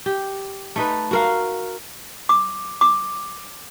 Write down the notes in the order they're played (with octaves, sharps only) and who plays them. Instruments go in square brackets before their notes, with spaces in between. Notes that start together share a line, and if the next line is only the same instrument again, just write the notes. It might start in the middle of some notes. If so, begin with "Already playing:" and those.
[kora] G4
A3 D#4 B4
F#4 A#4 F5
[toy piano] D6
D6